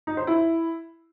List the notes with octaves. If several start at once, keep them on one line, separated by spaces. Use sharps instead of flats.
D#4
C5
E4